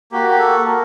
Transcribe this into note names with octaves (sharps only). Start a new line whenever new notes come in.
A#3 F#4 G4
G4
A4
A#3 A#4